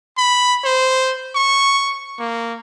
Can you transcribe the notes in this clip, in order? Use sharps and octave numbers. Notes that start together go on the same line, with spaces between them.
B5
C5
C#6
A#3